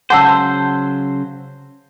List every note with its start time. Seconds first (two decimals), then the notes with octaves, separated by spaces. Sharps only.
0.10 C#3 F#3 C5 F#5 A5 E6